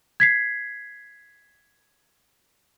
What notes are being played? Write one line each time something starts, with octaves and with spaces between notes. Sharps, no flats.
G#6 B6 C7